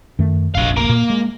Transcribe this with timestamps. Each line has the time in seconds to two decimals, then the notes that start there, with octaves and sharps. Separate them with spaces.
0.19 F#2 D#3 A3
0.55 F1 A#1 D4 F5
0.77 A#3
0.89 A#2
1.10 G#3